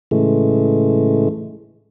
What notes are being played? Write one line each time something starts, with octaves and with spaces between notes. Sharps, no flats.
A2 C#3 E3 G#3 A3